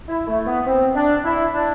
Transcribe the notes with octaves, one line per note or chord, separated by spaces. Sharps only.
E4
A3
B3
C4
D4
E4
D4